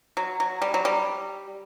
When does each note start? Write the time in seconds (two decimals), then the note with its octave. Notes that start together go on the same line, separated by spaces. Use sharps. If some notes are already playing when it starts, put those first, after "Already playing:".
0.17 F#3
0.40 F#3
0.62 G3
0.74 F#3
0.85 G3